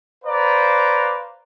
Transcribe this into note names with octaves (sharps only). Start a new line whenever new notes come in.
B4 C5 D5 F5 A#5